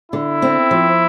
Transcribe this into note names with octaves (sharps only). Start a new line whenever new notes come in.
D3 E4
C4
F3